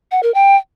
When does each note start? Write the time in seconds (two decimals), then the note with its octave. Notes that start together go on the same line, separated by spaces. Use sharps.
0.11 F#5
0.23 A#4
0.34 G5